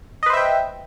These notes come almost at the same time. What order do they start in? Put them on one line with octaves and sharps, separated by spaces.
D#5 B4 C5 E5 G5